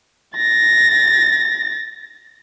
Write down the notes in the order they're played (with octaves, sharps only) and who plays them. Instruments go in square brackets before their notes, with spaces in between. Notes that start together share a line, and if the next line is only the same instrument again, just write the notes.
[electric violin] A6 A#6